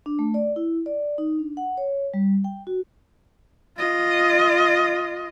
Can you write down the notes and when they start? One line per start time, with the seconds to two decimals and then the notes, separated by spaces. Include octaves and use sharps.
0.06 D4
0.19 A3
0.34 D5
0.56 E4
0.86 D5
1.18 D#4
1.39 D4
1.57 F#5
1.77 C#5
2.14 G3
2.44 G5
2.67 F#4
3.77 F4 D#5